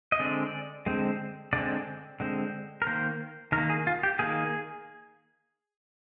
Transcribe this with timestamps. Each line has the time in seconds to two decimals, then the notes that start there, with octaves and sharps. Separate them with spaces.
0.12 D#5
0.19 D3 G#3 C4 D5
0.86 D3 G#3 C4
1.53 D3 G#3 C4 D5
2.20 D3 G#3 C4
2.82 A#4
2.87 D#3 A#3 C5
3.52 D#3 A#4
3.57 A#3
3.70 G#4
3.87 F4
4.03 G4
4.19 D#3 A#3 G#4